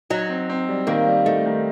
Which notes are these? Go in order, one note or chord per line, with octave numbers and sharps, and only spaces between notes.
F#3 D#4
C4
C4
G3
D#3 A#3
G3
A3 D#4
D#3